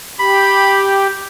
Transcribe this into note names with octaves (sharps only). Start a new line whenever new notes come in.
G4 B5